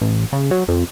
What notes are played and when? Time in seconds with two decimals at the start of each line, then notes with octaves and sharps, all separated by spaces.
0.01 A1
0.33 C#3
0.51 F#3
0.68 F2